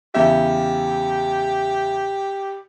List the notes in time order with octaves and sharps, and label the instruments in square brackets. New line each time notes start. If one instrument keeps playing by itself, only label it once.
[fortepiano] E2 C#3 E5 [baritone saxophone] G4